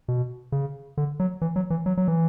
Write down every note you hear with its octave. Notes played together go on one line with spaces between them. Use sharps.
B2
C#3
D3
F#3
E3
F#3
E3
F#3
F#3
E3